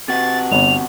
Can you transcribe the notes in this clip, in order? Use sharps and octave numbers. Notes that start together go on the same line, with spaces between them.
C3 F#4 A6
G1 F7